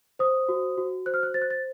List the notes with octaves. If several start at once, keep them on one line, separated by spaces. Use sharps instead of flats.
C5 D#6
F#4
F#4
C5 F#6
F6
F#6
C5 A6
F#6
A6